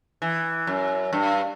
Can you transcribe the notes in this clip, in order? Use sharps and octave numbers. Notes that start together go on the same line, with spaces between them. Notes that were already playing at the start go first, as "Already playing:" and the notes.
E3
F#2
G2